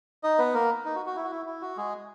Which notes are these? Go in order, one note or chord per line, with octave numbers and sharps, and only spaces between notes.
D#4 D#5
B3 B4
A#3 A#4
D#4
F#4
F#4
E4
F#4
E4
E4
F#4
G#3 G#4